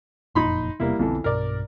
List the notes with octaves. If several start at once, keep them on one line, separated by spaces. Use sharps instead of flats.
F#1 F2 A#2 D#4 B5 C6
E1 C3 G3 A#3 B3 E4
B1 F2 D3 E3 B3 A4
B1 G2 B2 A#4 D5